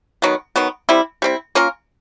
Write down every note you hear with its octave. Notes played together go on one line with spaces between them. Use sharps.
D#3 F#3 B3
D#3 F#3 B3
G3 C4 E4
G3 C4 E4
A#3 C#4 F4 A#4